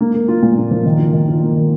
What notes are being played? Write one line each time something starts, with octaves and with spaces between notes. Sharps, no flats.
A#3
A#3
F4
A#2
A#3
F3
D#3
F4
D#3
F4
A#3
D#3